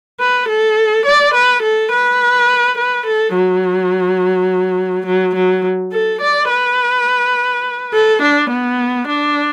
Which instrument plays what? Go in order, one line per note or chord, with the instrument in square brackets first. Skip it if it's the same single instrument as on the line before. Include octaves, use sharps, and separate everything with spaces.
[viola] B4
A4
D5
B4
A4
B4
B4
A4
F#3
F#3
F#3
A4
D5
B4
A4
D4
B3
D4